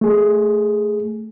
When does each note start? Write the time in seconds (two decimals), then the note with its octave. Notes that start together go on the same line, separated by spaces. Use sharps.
0.01 A3 G#4